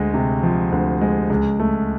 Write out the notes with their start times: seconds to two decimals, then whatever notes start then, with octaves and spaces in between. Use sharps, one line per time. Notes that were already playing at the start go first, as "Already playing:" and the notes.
Already playing: D2 G#3
0.14 C3
0.43 F3
0.72 D2
1.01 G#3
1.30 C#2
1.60 A3